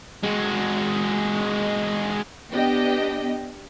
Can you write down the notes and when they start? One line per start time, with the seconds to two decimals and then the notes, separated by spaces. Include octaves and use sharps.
0.23 G#3 F#4
2.52 B3 D4 G4 D#5 G5